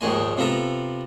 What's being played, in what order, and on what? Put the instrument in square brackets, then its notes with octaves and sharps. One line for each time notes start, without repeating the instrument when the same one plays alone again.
[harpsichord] A#1 D#2 G#2 D#3 G#3 G#5
C3 F3 B3 A4 A#5